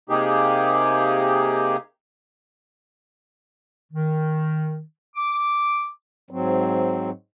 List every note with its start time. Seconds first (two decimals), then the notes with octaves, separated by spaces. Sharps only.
0.10 C3 A#3 D#4 G4 G#4
3.92 D#3
5.16 D6
6.31 G#2 F#3 C4